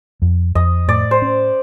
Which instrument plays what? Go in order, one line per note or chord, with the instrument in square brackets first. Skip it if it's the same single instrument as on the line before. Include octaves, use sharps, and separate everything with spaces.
[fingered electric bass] F2
[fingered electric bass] F2 [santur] D#5
[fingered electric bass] A2 [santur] D5
[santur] C5
[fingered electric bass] C#4